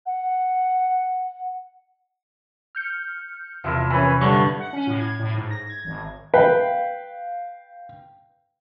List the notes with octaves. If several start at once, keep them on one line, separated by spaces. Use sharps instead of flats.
F#5
F6 G6 C#7
E2 C3 F3 E4 A#4
E3 C#4 B4
G2 D3 C#6
F#5
C#4
A2
G#6
A2
G#2
A#6
G#6
G#1
B4 F5 G5